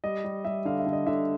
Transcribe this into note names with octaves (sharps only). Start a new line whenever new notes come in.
G3 D#5
G3
G3 E5
D3 F5
E5
D3
D#5
D3 E5